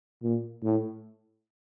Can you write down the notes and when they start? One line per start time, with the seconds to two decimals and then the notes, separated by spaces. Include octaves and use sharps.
0.22 A#2
0.63 A2